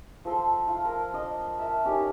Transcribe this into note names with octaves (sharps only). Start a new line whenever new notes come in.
F3 A4 C6
F4
A#4
D4 D#5 D#6
A#4 E5 A5
C#4 D#4 G4 A#4